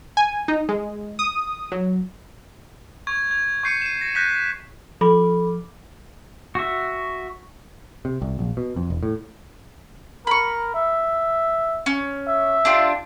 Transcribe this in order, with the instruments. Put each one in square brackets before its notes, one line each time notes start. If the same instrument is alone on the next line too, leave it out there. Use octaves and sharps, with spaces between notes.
[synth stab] G#5
D#4
G#3
D#6
F#3
[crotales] C#6 G#6
G#6
C#6 G6 C7 C#7 D#7
D#7 E7
A#6
F#6 G6 A#6 B6 E7
[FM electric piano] F3 D6 [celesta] A4 B5
[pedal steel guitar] F#4 E5
[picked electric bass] C3
C2
A#1
B2
F2
E1
A2
[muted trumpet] A#4 [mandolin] B5 C#6
[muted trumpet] E5
[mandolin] C#4
[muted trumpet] E5
[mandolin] D4 F4 G4